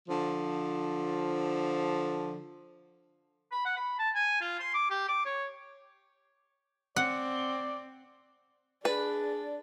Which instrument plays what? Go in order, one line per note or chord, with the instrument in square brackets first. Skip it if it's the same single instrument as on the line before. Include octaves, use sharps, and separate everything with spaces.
[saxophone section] D3 F3
[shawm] B5
F#5
B5
A5
G#5
F4
C6
D6
G4
D6
C#5
[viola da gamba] C4 [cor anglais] D5 [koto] F#5
[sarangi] D4 [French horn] G#4 [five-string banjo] B4 [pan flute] D5